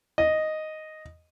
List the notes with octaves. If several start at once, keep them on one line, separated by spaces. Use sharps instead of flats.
D#5